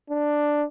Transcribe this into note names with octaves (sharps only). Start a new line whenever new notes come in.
D4